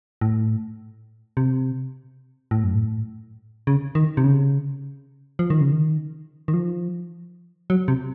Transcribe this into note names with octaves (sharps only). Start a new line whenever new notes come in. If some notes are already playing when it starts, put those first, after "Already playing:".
A2
C3
A2
F#2
A2
C#3
D#3
C3
C#3
F3
D#3
C#3
D#3
D#3
F3
F#3
C3